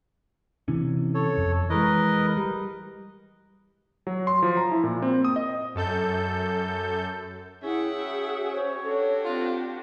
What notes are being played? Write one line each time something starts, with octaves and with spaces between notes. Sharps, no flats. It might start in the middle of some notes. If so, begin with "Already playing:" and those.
C3 E3 C#4
A4 C#5
F2
E3 G#3 A#4 B4 D#5
G3
F#3
C6
F3
A#5
E4
A#2
C4
D#6
D#5
F#2 A4 G6
C#4 E4 G#4 E5 F#5 G5
F#4
C5 C#5
D4 F#4 G4 A4
C4 F4